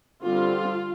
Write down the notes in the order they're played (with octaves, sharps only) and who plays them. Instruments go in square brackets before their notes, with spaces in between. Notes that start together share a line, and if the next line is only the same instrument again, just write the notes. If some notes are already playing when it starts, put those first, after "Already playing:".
[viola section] D3 G3 C4 F4